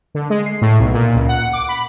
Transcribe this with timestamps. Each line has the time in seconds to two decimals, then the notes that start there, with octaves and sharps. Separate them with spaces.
0.15 D3
0.30 G#3
0.46 C7
0.61 A2
0.80 B1
0.94 A#2
1.15 C#2
1.28 F#5
1.53 D6
1.68 B5